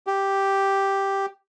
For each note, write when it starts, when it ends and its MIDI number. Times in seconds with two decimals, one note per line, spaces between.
0.07 1.26 67